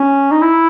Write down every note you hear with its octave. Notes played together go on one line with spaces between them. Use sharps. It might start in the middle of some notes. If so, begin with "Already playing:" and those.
Already playing: C#4
D#4
E4